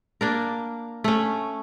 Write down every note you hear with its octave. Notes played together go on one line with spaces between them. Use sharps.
A#3 D4 A#4
A3 C#4